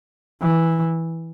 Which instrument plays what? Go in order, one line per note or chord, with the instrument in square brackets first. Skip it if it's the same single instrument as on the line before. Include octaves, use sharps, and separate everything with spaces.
[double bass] E3